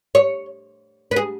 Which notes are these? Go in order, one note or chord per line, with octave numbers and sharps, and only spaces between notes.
C#5
B4
G#4